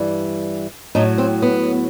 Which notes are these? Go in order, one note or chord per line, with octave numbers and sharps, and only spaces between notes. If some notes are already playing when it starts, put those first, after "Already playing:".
Already playing: G2 E3 G3
A2 F#3 D#4
C4
B3